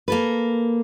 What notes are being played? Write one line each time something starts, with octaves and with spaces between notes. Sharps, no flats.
A#3 A4 B4